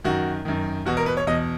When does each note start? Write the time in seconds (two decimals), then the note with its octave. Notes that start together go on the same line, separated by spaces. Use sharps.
0.04 F#2 D#3 F#4
0.45 F#2 D#3
0.85 E2 B2 F#4
0.97 A#4
1.06 B4
1.17 C#5
1.27 E2 B2 D#5